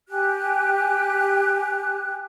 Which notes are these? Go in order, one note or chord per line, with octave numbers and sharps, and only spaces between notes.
G4 G#5 F#6